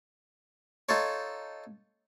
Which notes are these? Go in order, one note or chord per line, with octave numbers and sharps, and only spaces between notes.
D#4 F4 A4 C#5